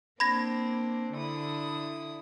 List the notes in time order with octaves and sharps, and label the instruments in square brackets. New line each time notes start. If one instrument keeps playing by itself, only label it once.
[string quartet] A#3 C4 D4 [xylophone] B5 G#6 A#6
[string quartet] D3 E4 D#6